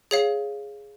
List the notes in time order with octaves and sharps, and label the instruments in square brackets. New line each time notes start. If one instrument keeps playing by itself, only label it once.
[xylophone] G#4 C#5 F5